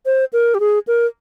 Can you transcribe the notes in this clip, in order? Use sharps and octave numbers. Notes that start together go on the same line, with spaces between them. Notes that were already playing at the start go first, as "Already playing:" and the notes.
C5
A#4
G4
G#4
A#4